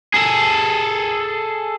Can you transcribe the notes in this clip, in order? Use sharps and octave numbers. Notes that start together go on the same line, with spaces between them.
G#4 A4